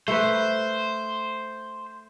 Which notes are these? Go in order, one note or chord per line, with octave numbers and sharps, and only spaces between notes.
A3 B4 C5